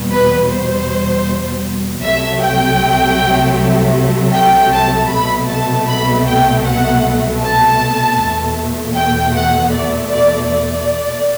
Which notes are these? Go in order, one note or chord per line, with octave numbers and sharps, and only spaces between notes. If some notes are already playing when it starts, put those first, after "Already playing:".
Already playing: E2 B2 G3
B4
C5
C2 C3 F#3 A3 E5
G5
G5
A5
C2 B2 F#3 A3 B5
A5
B5
G5
F#5
A5
E2 B2 A3
G5
F#5
D5
D5
D5